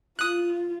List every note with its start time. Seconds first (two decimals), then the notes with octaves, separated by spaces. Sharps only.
0.19 F4 D#6 F#6